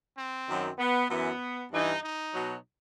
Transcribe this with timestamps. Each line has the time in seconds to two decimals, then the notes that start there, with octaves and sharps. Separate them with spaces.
0.16 C4
0.48 F#2 D#3 F#3
0.79 B3
1.09 F#2 E3 B3
1.71 G2 E3 D#4
2.02 D#4
2.33 B2 F#3